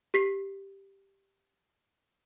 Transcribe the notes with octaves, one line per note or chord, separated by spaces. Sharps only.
G4 B6 C7